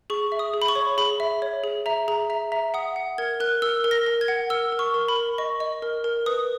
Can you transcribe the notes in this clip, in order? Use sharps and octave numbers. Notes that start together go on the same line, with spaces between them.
G#4 C#6
E5
D#6
G#4
B5
C#6
C#5
G#4 B5
E5
C#5
G#4
E5 A#5
G#4 A#5
E5 A#5
E5 A#5
F#5 D#6
F#5
A#4 G#6
A#4 F#6
A#4 E6
A#4
A#6
A#4
G#6
F#5
A#4 E6
A#4
C#6
A#4
B5
A#4
D#5 C#6
D#5
A#4
A#4
B4 D#6